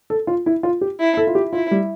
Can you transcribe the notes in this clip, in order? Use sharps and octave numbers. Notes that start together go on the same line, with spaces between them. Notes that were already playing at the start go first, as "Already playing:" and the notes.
A4
F4
E4
F4
G4
E4
A4
F4
G4
E4 F4
G3